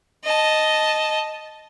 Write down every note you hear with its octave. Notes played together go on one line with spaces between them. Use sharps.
D#5 A5